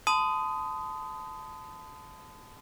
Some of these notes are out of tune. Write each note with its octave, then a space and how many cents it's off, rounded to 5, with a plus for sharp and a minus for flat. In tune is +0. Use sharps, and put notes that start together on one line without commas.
A5 -10 C6 -40 D#6 +0